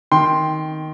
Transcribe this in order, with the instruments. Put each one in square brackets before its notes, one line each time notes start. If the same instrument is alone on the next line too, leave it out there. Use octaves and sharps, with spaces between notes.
[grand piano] D#3 G5 C6